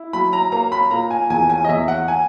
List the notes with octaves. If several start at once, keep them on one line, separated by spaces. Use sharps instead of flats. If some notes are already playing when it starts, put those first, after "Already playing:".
Already playing: E4
F#3 B5
A#5
A#3 A#5
B5
A#2 A#5
G#5
E2 G#5
G#5
D#5
E2 E5
F#5
G#5